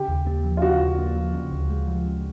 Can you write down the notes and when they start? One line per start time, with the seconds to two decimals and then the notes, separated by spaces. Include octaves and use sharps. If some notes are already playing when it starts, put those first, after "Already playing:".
Already playing: C#3 G4
0.08 D#2
0.27 A#3
0.44 F3
0.57 F4
0.62 C#3 F#4
0.80 D#2
0.98 A#3
1.16 F3
1.34 C#3
1.52 D2
1.70 G#3
1.88 F3
2.06 C#3